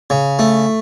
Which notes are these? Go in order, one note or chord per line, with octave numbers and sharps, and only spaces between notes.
C#3
A3